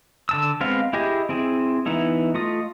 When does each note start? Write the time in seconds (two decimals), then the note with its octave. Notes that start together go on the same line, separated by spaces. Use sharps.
0.29 D3 A5 E6
0.61 G#3 B3 C4 F5
0.93 E4 G4 G#4 D#5
1.29 C4 E4 G#4
1.86 E3 B3 D#4 E4
2.34 A3 F4 D#5 D#6